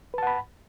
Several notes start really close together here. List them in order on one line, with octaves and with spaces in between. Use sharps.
B4 A5 F#5 B5